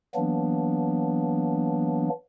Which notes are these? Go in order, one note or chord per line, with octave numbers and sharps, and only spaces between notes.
E3 F#3 A#3 B3 D4